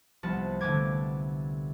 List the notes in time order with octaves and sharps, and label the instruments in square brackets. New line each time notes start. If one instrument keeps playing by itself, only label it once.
[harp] C2 F3 B3 F#5 A5 A6
C2 D3 A3 B3 D6 G#6